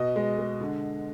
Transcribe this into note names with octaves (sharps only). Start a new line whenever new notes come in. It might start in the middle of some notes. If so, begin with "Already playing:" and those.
Already playing: B2 D#5
G#3
G#3
D3